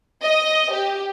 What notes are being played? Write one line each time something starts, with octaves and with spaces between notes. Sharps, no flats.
D#5
G4